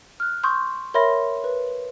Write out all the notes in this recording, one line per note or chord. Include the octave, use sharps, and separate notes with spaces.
F6 F#6
C6 C#6 D#6 G6
A#4 C#5 E5 B5 C6 A#6
B4